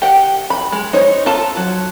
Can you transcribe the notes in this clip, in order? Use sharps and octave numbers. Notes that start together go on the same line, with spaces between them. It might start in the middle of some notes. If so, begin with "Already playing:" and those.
G4 F#5 G5
B5
G#3
D#4 C5 C#5
F4 A4 A5 A#5
F#3